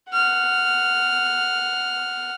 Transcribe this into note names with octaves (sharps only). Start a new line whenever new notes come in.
F#5 F6